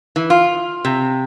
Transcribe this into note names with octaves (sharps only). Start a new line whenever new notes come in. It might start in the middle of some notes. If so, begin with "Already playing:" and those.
E3
F4
C3